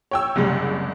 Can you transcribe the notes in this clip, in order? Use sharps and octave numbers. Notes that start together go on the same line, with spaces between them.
C#5 G5 E6
F#1 C2 G3 G#3